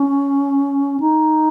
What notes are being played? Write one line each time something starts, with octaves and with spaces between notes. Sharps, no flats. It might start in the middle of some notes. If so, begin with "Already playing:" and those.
Already playing: C#4
D#4